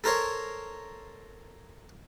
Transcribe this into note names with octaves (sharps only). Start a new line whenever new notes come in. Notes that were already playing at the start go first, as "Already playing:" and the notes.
A4 A#4 C5 C#5